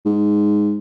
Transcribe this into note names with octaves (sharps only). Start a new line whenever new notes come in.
G#2